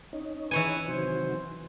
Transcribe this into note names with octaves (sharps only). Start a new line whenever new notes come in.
C#4 D#4
E3 B4 C#5 G#5
C3 D#3 F#3 C5